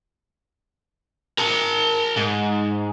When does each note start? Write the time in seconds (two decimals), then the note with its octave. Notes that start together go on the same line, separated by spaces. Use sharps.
1.38 A#4 A5
2.17 G#2